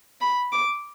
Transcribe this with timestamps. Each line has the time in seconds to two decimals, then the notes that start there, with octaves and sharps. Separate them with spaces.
0.21 B5
0.52 D6